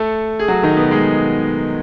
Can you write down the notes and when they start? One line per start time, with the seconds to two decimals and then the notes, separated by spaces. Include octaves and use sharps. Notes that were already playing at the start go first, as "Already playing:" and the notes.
Already playing: A3 A4
0.39 G#4
0.48 F#3 F#4
0.63 D#3 D#4
0.77 B2 B3
0.91 G#3 G#4